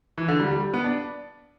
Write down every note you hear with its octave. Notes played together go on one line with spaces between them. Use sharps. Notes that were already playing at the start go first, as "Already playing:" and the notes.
E3
D3
G3
G3
B3
D4